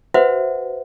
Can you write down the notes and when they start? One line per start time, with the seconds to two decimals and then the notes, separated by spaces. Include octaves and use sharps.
0.14 F#4 B4 C5 E5 F#5